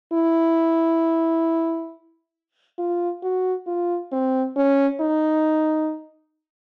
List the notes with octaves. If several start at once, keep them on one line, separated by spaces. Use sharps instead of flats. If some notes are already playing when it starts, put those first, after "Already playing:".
E4
F4
F#4
F4
C4
C#4
D#4